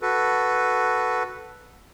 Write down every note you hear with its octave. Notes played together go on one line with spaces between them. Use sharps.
F#4 A4 B4